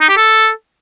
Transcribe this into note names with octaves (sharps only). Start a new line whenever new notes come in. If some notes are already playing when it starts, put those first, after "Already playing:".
D#4
G4
A4